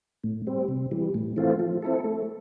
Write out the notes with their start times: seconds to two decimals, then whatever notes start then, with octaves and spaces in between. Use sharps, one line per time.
0.24 A2
0.47 G3 C4
0.68 C3
0.91 E3 G3
1.14 A2
1.36 E3 A3 C4 F4
1.59 F3
1.82 C4 E4 A4
2.04 A3